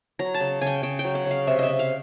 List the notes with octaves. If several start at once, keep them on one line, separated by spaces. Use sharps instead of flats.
F#3 A#5
A5
C#3
C#3 G#5
G5
C#3 G5
G5
F#3
F#5
C#3
F5
C3 E5
D#5 E5
C3
F5